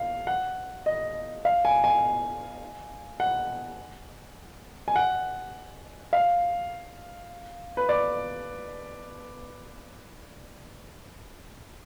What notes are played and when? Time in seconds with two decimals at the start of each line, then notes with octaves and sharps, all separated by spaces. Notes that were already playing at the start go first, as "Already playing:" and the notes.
Already playing: F5
0.27 F#5
0.86 D#5
1.45 F5
1.65 G#5
1.84 G#5
3.20 F#5
4.88 G#5
4.96 F#5
6.13 F5
7.77 B4
7.89 D5